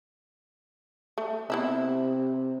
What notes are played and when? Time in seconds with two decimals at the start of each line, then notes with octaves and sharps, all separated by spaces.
1.18 A3
1.50 C3 B3 E4 E5